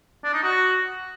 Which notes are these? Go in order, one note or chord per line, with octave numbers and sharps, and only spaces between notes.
D4
D#4
F#4